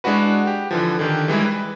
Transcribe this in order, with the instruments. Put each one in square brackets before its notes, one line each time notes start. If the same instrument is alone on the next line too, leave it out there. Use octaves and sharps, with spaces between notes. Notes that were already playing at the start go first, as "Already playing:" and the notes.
[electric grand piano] G#3 D4 E4 F#4 B4
G4
D3 E3 F3
D3 D#3 G4
E3 G3 G#3 E4
B4